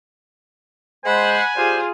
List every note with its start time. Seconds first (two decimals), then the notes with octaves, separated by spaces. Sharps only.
1.06 G#3 C5 F#5 G#5 B5
1.56 G3 F4 G4 G#4 C5